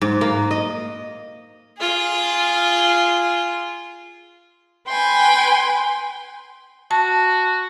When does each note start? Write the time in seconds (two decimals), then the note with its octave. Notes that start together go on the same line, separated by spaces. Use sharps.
0.01 G#2
0.21 A#3
0.51 D#5
1.78 F4 G#4
4.88 B4 G5 G#5 C6
6.91 F#4 A5